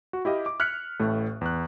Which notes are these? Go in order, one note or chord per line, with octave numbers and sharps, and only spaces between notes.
F#4
E4 G4 D#5 F5
D6
F6 F#6 G#6 B6 C#7
A1 A2 A3
E2 F#6